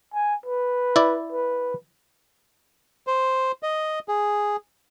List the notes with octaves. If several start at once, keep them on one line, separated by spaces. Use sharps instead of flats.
G#5
B4
E4 D5
B4
C5
D#5
G#4